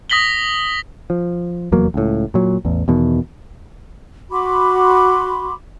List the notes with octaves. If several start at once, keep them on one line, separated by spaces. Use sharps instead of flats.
D#6 A#6 B6 F#7 G7
F3
F1 E2 F#3 A#3
C#2 A2
A#2 F#3
A1 E2
E2 B2 D#3
F#4 B5 C6 D6